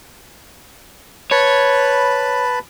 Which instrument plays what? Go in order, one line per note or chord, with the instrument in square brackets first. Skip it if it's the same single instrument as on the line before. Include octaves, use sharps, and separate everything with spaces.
[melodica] B4 A5 B5 [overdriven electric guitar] C#5